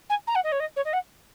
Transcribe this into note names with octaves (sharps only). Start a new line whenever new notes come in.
G#5
A#5
F#5
D#5
C#5
D#5
C#5
D#5
F#5